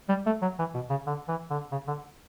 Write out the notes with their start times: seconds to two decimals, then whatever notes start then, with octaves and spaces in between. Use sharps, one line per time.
0.09 G3
0.26 A3
0.42 F#3
0.59 E3
0.75 B2
0.90 C#3
1.06 D3
1.28 E3
1.50 D3
1.72 C#3
1.87 D3